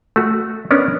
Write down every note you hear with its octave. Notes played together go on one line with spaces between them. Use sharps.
A3 F#4
B3 C#4 D4 A#4